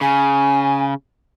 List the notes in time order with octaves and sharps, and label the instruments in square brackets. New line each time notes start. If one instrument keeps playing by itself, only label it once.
[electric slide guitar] C#3 [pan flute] G#5